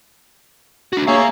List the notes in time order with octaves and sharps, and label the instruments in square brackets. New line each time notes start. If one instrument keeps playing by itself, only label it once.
[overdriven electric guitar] D4 F#4
[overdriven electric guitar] A#3 F5 [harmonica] G#4 E5 A#5 [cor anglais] C#5